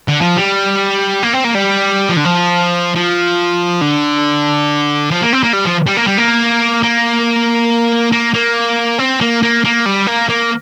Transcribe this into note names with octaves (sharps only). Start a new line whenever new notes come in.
D3
F3
G3
A#3
C4
A#3
G3
F3
D3
F3
F3
D3
F3
A#3
C4
A#3
G3
F3
G3
A#3
G3
A#3
A#3
A#3
A#3
C4
A#3
A#3
A#3
G3
A#3
A#3